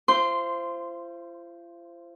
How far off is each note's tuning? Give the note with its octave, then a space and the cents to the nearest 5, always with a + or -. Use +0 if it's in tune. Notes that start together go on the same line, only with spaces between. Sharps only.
F4 -40 C5 +0 C6 -10